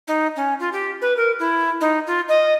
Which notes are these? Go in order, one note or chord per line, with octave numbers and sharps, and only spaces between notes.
D#4
C#4
F4
G4
B4
A#4
E4
D#4
F4
D#5